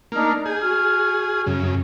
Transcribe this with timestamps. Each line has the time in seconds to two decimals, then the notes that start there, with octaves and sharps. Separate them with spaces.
0.12 A#3 D4 D#4 F6
0.46 G#4 G6
0.61 F#4 F6
1.46 F#2 C#3